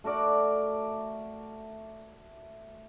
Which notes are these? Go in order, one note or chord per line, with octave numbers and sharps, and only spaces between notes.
A3 F#4 A#4 D5